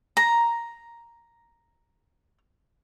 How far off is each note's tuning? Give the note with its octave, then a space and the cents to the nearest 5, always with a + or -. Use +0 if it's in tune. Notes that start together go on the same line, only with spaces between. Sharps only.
A#5 +0